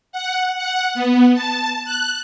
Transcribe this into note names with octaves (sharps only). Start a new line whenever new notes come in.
F#5
F#5
B3
A5
F#6